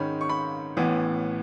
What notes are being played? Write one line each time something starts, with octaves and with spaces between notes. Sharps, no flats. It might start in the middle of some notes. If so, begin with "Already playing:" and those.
Already playing: G#2 D#3 G#3 C#4 B5
C#6
B5
A1 A2 E3 B3